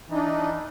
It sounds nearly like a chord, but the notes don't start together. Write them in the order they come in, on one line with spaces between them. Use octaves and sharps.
E3 D#4 D4